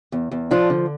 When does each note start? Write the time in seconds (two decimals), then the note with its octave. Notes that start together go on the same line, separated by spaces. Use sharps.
0.12 E2
0.31 E2
0.51 F3 D4 F4
0.70 D3